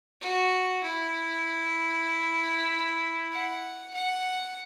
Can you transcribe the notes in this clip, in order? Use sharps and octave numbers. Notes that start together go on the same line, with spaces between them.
F#4
E4
F#5
F#5